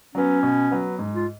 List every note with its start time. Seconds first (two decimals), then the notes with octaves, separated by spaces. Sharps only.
0.15 F#3 B3 C#4
0.43 B2
0.71 F#3 B3
0.99 G#2
1.15 F4